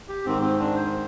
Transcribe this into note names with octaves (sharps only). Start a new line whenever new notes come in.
G4
G#2 D#3 C4
C4
D4
C5